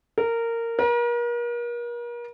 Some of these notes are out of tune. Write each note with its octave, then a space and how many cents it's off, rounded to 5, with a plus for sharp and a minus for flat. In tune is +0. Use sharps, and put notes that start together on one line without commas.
A#4 -15
A#4 +40